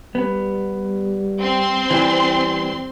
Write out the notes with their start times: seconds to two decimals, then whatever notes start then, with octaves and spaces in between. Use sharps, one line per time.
0.15 G3 B3
1.40 C4 C6
1.91 E3 G3